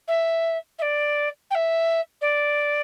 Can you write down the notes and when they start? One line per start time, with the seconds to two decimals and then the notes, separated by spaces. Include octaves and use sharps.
0.07 E5
0.78 E5
0.81 D5
1.50 G5
1.54 E5
2.21 D5